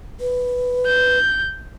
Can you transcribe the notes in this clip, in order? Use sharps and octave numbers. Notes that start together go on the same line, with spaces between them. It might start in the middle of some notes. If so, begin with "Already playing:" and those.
B4
G6